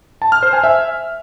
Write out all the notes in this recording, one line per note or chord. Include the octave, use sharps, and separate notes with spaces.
A5
F6
C5
G#5
E5